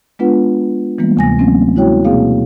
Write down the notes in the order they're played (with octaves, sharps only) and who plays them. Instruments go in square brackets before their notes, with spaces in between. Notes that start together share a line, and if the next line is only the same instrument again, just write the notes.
[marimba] G#3 B3 D4 F4 B4 F#5
E3 G3 G#3 A#3 B3
D2 C3 G#5 A#6
F#3 A3 A#3 C4 C#4
G#3 E4 F#4 C#5 G5
B2 A#3 C4 G#4 F5